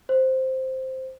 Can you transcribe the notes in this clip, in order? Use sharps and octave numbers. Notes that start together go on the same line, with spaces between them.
C5